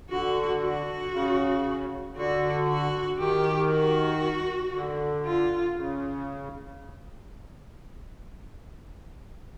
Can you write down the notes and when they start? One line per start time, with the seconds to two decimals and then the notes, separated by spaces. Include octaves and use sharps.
0.10 D3 F#4
0.62 F#4
1.13 C#3
2.16 D3 F#4
2.68 F#4
3.19 D#3 G4
3.71 F#4
4.73 D3
5.25 F4
5.76 C#3